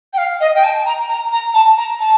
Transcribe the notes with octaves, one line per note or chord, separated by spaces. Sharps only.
G5
F5
D#5
G5
A5
A#5
A#5
A#5
A5
A#5
A5